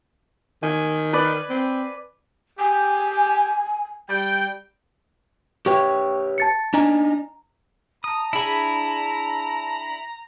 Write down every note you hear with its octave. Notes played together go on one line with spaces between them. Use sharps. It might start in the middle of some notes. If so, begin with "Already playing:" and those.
D#3 G#5
B4 D5
C4
G4 G#5
G3 G5
G4 B4 C#5 G5 C#6
A5 A6 C#7
D4 D#4 G#5 A#5
A5 A#5 D#6
D4 E4 G#4 B5